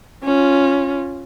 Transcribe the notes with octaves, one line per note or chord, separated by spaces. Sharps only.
C#4 F4